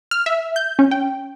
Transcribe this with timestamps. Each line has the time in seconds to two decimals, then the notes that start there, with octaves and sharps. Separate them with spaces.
0.11 F6
0.26 E5
0.56 G6
0.79 C#4
0.91 G5